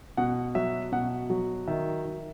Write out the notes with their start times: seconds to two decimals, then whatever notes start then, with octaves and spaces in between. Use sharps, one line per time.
0.17 B2 F#5
0.55 F#3 E5
0.92 B2 F#5
1.30 F#3
1.68 D#3 E5
2.05 D#3